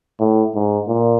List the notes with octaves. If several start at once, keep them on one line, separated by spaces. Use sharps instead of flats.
A2
G#2
A#2